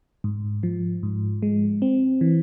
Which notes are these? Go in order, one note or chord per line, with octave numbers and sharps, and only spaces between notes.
G#2
F3
G#2
G#3
C4
E3